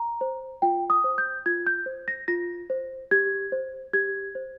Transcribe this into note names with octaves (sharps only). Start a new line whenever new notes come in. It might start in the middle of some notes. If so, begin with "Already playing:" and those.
Already playing: A#5
C5
F4 G5
D#6
C5
G6
F4 G#6
G6
C5
A#6
F4 A#6
C5
G4 G#6
C5
G4 G#6
C5